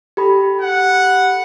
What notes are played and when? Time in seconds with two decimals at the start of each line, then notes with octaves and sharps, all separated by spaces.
0.17 G4 A4 B5
0.62 F#5